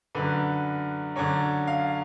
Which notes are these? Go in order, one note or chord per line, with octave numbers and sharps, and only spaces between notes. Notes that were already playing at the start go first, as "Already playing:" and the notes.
F#2 D3 B4
F#2 D3 C#5
F5